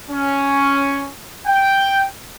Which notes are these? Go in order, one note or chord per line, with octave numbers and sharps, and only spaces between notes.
C#4
G5